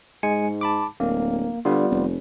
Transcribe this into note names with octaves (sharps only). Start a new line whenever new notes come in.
G#2 G#3 G#5 C#7
A5 B5 D6
D1 A#3
D3 G3 B3 F4
F1